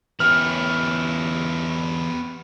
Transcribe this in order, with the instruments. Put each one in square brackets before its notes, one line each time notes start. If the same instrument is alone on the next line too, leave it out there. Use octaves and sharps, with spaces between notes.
[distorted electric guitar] E2 C#5 [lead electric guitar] B3 G4 [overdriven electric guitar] C#4 E4 [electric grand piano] F6